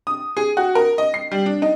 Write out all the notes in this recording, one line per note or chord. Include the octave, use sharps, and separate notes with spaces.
D#6
G#4
F#4
A#4
D#5
C7
G3
D4
D#4